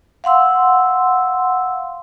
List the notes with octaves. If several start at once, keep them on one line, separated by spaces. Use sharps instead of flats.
F5 F#5 C6 E6